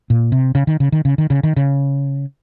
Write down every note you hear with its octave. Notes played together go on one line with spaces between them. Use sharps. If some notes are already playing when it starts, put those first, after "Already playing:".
A#2
C3
C#3
D#3
C#3
D#3
C#3
D#3
C#3
D#3
C#3